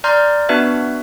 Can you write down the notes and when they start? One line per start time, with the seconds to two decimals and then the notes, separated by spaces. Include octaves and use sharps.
0.04 D5 A#5 C6 F6 G6
0.49 B3 D4 F#4 B4 E5